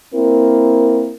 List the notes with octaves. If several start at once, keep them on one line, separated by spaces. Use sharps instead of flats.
A#3 C4 E4 A#4